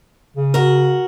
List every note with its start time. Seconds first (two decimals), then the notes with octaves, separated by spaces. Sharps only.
0.37 C#3
0.54 F#4 A#4